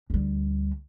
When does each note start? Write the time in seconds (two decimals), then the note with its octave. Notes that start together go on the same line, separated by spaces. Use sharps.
0.10 D2 G3